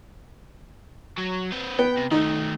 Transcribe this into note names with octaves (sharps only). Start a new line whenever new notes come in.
F#3
C4 B4
B3 G5
C3
D#3 A3 D#4